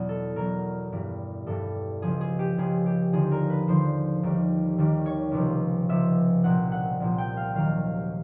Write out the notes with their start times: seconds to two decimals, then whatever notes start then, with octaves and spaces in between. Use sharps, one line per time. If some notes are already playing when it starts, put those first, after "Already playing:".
Already playing: E2 B2 F#3
0.09 A4
0.36 E2 B2 F#3 A#4
0.92 G2 E3 G3
1.47 G2 E3 G3 A4
2.02 C#2 C#3 F3 G#4
2.21 G#4
2.39 G4
2.57 C#2 C#3 F3 G#4
2.86 G4
3.12 D#2 D3 F3 G#4
3.31 A#4
3.50 B4
3.68 D#2 D3 F3 C5
4.23 D#2 D#3 G3
4.78 D#2 D#3 G3
5.06 C#5
5.31 C#2 C3 F3
5.89 C#2 C3 F3 E5
6.44 C2 A#2 F3 F#5
6.72 F#5
7.00 C2 A#2 F3
7.18 G5
7.37 F5
7.55 D#2 D#3 F#3 F5